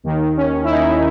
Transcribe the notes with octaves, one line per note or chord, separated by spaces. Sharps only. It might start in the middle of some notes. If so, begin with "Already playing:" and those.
D#2 D#3
C#4
E4
D#4